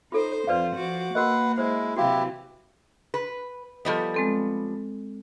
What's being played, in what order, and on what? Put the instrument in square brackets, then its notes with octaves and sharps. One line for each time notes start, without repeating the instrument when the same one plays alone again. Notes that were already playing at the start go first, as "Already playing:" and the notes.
[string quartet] D#4 C5 [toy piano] F4 A4
[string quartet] F2 F4 [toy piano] B4 D5 F5 [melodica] C5
[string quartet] F3 F#4 D6
[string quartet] A#3 [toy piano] F#4 A#4 D#5 [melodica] B4 F#5
[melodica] G#3 E4 [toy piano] C5
[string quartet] C3 E3 F#3 [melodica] E4 G4 [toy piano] F#4 F5
[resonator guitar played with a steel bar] B4
[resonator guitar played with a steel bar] F3 G3 B3 [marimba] A4 D#5
[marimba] G#3 C4 A4